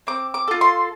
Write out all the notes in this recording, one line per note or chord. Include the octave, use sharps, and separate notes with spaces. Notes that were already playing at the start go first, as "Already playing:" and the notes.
C4 D6
D6
F4 A4
C6